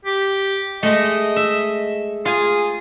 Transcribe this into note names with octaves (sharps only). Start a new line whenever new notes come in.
G4
G#3 A3 D#5
E5
F4 G#4 G#5